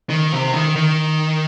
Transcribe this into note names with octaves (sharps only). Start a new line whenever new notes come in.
D#3
C3
D#3
D#3